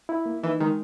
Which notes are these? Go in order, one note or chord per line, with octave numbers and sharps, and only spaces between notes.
E4
A#3
E3 D#4
D#3 G#3